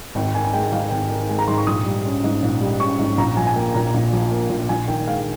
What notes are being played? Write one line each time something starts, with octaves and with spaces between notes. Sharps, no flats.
G#1 G5
G5
D#3 G#5
G#5
G#3 G5
G#2 F5
G#1 G5
D#3
G#3 G#5
A#5
G#2 C6
C#6
A#1 D#6
G3
C#4
G#2
A#1
G3
C#4 C#6
G#2
A#1 A#5
F3 G#5
G#5
A#3 G5
A#2 A#5
A#1
F3
A#3
A#2
A#1 G#5
D#3 G5
G#3 F5